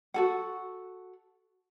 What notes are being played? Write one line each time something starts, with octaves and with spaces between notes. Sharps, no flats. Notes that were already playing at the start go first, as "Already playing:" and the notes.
F#4 A4 F#5